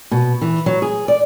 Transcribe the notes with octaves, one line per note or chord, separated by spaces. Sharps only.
B2
E3
F#3
G#4
D5